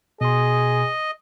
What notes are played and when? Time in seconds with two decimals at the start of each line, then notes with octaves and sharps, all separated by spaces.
0.21 B2 G#4 D#5 C6